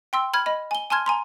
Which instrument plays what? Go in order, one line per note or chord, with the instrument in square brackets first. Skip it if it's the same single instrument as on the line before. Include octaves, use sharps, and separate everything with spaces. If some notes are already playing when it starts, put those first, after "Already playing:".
[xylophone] G5 C6 E6
B5 F6 G#6
D#5 B5
G#5 G7
G#5 A5 C6 F6 G#6
G#5 A#5 C6